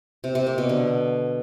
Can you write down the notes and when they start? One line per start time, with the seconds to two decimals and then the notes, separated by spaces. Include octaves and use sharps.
0.24 C3
0.35 C3
0.47 A#3
0.58 B2
0.69 D3